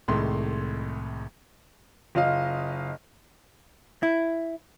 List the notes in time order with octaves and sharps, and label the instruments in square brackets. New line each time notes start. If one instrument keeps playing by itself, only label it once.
[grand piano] C2 A2 D#3 G#3 C6
[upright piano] F#1 F4 D#5 F5
[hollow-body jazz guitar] E4